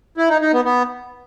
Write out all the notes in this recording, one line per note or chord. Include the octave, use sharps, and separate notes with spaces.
E4
D#4
D#4
B3
B3